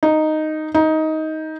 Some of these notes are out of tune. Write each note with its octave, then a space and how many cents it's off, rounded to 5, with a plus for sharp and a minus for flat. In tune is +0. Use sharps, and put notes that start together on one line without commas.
D#4 -5
D#4 +15